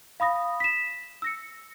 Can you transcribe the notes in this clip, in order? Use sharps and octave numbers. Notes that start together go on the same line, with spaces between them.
F5 B5 D#6 A#6
B6 E7
E6 A#6 C#7